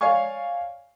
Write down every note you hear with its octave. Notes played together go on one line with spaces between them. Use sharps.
C#5 D5 F5 G#5 C#6